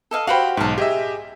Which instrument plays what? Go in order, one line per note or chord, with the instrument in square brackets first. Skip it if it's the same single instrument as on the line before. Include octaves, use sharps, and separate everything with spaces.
[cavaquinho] A4 D#5 F5
[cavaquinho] F#4 G4 C5 [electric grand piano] F5 F#5 B5
[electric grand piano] B1 G#2 [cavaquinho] F5 A5
[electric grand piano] G4 D#5 E5 [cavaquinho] G#4